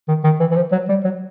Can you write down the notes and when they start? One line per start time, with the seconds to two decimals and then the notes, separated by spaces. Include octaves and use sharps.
0.08 D#3
0.24 D#3
0.40 E3
0.51 E3
0.56 F3
0.72 F#3
0.89 G3
1.04 F#3